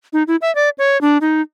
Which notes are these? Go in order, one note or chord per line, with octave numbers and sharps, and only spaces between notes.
D#4
E4
E5
D5
C#5
D4
D#4